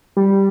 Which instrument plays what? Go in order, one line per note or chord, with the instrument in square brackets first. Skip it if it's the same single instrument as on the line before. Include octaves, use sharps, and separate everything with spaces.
[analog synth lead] G3